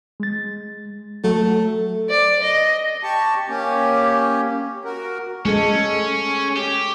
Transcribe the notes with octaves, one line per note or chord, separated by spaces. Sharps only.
G#3 A6
F#3 A3
D5
D#5
G4 A5 C#6
A#3 C#4 G4
F#4 A#4
G#3 C#4 A4
G4